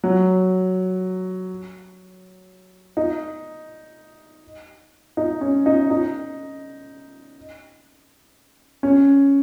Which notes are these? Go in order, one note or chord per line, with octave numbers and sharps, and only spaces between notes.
F#3
D#4
D#4
C#4
D#4
D#4
C#4